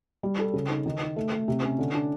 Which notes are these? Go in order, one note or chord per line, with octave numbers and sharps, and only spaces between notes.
G3
A4
C#3
D#4
D#3
D#4
A3
A3
C3
C#4
D3
D4